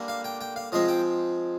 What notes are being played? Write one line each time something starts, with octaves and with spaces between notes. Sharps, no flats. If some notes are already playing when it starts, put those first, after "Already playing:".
Already playing: D3 G3 A#3
F5
G5
G5
F5
F3 G#3 C4 D#5
G5